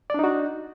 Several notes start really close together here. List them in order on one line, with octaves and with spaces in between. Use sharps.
D5 D4 D#4 F#4